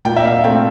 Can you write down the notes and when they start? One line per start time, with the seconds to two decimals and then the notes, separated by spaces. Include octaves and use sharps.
0.05 A#2 G5
0.16 E5
0.25 F5
0.44 A3 C4 G5